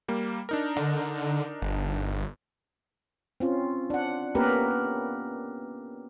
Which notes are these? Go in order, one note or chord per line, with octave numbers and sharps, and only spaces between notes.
G3 A#3
D4 D#4 A#4
D3
G1
C4 C#4 F4
D4 F#5
A#3 B3 C#4 G4 A#4 B4